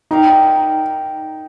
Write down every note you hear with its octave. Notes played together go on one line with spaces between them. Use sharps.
D#4 G4 A#4 D5 F5